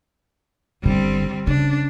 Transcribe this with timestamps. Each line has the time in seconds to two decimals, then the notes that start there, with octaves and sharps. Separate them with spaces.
0.84 G1 D3 G3 C4
1.47 C#3 D4